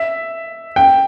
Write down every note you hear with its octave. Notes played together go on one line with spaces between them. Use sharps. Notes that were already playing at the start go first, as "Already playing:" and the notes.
Already playing: E5
G5